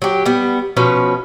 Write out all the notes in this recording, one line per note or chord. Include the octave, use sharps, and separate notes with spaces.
F#3 G4
G3 B3
B2 F3 C#4 B4